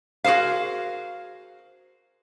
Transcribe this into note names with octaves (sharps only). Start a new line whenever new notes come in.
F#4 G#4 A#4 C5 F5